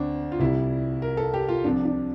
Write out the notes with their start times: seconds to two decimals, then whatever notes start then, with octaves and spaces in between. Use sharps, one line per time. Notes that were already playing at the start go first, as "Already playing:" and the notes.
Already playing: D2 C4 D4
0.32 F4
0.40 C2 C3 G3 E4
1.02 A#4
1.17 A4
1.34 G4
1.49 F4
1.64 C2 C3 F3 D4
1.85 D4